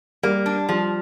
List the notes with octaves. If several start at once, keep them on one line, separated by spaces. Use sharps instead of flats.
G3 A#3
D4
F3 G3